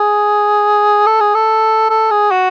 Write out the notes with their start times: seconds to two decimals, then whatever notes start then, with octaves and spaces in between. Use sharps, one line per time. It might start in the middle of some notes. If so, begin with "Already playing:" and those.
Already playing: G#4
1.06 A4
1.20 G#4
1.35 A4
1.90 A4
2.11 G#4
2.31 F#4